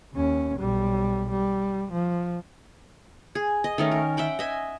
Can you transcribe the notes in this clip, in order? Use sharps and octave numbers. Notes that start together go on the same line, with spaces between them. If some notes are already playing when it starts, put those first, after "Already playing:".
D#2 C#4
B1 G3
G3
F3
G#4
D#5
D#3 A3 C#4
A#4
E5 F#5 G5 B5
D#5 E5 G#5